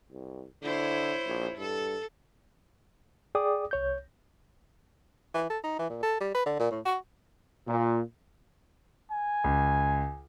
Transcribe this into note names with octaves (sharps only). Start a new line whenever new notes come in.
C2
D3 E4 C5 C#5
A#1
G2 A4
G#4 D5 G5 D6 D#6
C2 C#5 G6
E3
A4
D#4
E3
A#2
A4
G3
B4
D3
A#2
A2
F#4
A#2
G#5
C#2